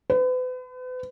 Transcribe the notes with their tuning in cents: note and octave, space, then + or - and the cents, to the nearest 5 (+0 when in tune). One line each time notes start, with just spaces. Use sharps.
B4 +40